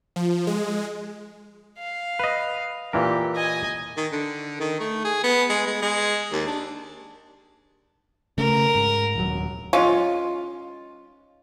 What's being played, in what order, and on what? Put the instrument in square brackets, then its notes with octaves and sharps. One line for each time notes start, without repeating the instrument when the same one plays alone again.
[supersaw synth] F3
G#3
[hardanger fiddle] F5
[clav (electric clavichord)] B4 D#5
[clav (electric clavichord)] A#2 E3 A#4 [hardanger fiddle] G4
[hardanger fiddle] D#5 G#5
[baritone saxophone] D#3
D3
D#3
A3
G#4
B3
G#3
G#3
G#3
D#2
D4
[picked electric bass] C#3 A3 [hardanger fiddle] A#4
[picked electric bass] G#2
D#1 F#3
[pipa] G#3 C#4 D#4 F4